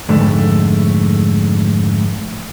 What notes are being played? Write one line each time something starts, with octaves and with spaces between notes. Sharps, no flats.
F2 G#2 D3 A3